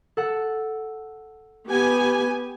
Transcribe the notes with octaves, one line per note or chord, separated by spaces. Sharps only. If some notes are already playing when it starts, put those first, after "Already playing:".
A4 F#5
B3 G4 G#5